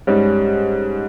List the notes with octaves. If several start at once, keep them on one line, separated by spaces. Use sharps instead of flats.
G#2 G3 C#4